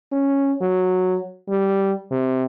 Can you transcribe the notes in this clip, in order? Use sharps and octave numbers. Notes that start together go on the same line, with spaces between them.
C#4
F#3
G3
C3